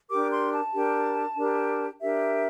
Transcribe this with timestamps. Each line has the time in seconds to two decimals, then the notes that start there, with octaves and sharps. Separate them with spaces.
0.10 D4 G4 A#4 D6
0.31 C6
0.53 A5
0.74 D4 G4 A#4
1.37 D4 G4 A#4
2.01 D4 G4 A#4 E5